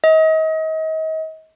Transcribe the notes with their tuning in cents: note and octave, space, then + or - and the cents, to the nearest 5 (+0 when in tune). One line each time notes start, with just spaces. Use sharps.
D#5 +35